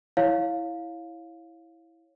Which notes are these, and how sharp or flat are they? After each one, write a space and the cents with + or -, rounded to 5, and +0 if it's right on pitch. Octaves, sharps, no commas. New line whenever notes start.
E4 -5 C#5 +0 F5 +5